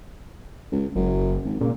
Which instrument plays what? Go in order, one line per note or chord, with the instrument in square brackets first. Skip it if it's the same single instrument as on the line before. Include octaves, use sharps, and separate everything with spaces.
[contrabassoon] C#2
[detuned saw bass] F#1 [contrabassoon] F#2
[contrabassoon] G#1
[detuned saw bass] A#2 [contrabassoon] C#3